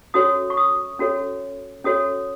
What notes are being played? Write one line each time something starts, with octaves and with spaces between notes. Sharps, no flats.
C#4 F#4 A4 C#5 D#6
C#6
D#6
C#4 F#4 A4 C#5
C#4 F#4 A4 C#5 D#6